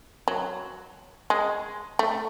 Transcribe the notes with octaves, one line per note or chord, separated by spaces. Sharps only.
F#3
G#3
A3